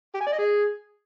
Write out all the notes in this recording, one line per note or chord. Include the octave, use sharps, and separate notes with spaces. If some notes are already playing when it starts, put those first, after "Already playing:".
G4
G#5
D5
D#5
G#4